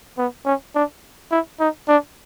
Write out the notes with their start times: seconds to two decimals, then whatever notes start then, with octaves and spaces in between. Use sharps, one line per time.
0.18 B3
0.45 C#4
0.75 D4
1.31 E4
1.60 D#4
1.88 D4